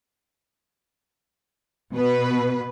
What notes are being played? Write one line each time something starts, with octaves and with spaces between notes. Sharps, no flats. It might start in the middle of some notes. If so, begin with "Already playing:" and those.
B2 B4